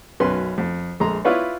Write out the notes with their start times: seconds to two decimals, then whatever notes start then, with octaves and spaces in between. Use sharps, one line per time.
0.20 B1 F#2 C#4 B4 C6
0.58 F2
1.00 A#1 G#3 A4 A#5 C6
1.25 E4 F4 B4 C#5 D5